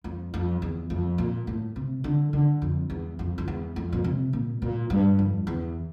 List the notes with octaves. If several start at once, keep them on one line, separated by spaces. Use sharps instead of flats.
F2
F2
E2
F2
A#2
A2
C3
D3
D3
F2
E2
F2
F2
E2
F2
A#2
C3
A#2
A#2
G2
F2
E2